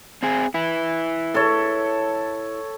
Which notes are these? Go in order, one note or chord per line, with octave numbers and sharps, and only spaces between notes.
C4 G#4
E4 B4
A4 C#5